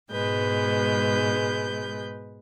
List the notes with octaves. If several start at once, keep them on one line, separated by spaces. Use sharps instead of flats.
G#2 B2 G#3 B4 G6